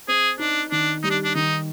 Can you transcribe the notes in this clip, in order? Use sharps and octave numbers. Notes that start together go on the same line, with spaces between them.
C4 G#4
D4 D#4
D#3 D4
G3 D#4
D4
D4
D#3 D#4